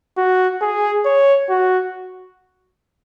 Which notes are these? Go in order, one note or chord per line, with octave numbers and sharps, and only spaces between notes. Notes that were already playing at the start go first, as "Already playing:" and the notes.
F#4
G#4
C#5
F#4